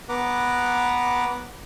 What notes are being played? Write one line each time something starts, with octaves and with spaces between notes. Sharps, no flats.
B3 B4 F#5 A#5 D6